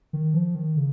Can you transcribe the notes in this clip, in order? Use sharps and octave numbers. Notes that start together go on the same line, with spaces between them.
D#3
F3
D#3
C#3